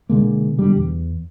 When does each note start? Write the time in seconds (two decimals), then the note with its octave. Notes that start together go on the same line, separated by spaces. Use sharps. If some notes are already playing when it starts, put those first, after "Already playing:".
0.10 B2 D3 G#3 A#3
0.59 B2 D3 G3
0.77 E2